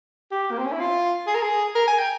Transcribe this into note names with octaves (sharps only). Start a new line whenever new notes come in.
G4
A#3
C4
C#4
E4
F4
G#4
A#4
G#4
A#4
G#5
G5